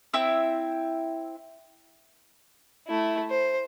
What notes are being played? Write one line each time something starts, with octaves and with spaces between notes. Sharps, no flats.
C4 E4 E5 E6
A3 E4
C5